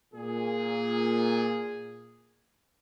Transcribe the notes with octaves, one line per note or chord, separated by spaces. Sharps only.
A#2 G#4